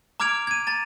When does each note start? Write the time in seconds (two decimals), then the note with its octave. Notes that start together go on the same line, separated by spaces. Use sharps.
0.20 A#5 D6 F6 G#6 D7 F7
0.47 G#6 D#7
0.67 A#5 A6